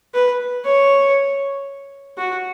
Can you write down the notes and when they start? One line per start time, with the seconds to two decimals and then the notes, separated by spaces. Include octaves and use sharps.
0.14 B4
0.65 C#5
2.18 F#4